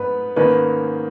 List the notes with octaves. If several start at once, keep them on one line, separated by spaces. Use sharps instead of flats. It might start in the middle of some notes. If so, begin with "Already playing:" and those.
Already playing: G#2 B3 B4
G#2 D#3 A#3 C#4 B4